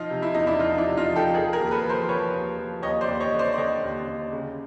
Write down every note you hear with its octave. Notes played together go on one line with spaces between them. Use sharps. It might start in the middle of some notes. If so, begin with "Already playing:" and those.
Already playing: F3 D#4 F4
C3
E4
E2 D#4
D4 E4
F3 D#4 F4
D4 E4
C3
D#4 F4
F3
G4 A4
F3 G#4 A#4
G#4 A#4
D#2
A4 B4
F3
A#4 C5
F3 B4 C#5
D#2
F3
D#2 C#5 D#5
C5 D5
D#2
C#5 D#5
D3
C5 D5
D5
D3 C#5 D#5
D#2
D#2
C#3